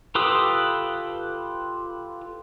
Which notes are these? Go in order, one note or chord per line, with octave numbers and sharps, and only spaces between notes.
F4 G4 A4 B4 D#6